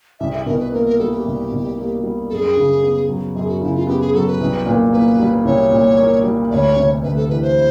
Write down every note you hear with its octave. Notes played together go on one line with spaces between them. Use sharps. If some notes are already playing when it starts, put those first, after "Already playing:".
C2 E5
E5
B2 A#4
B4
A#3 A#4
A#4
G3 A4
G4
C2
B2
A#3
G3
F#2 G#4 A4
C#3
B3
F#3
F#2 G#4
F#4
C#3 E4
F4
B3 G4
G#4
F#3 A4
B4
C2
A#2
A#3 B4
G3
C2 C#5
A#2
A#3
G3
D2 C#5 D5
C3
D2 B4
A4
E3 B4
C5